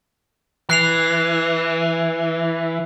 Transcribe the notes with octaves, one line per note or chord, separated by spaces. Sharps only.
E3 F#6 C7 F7